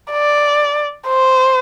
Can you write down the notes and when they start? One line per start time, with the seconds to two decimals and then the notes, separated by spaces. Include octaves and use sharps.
0.12 D5
1.08 C5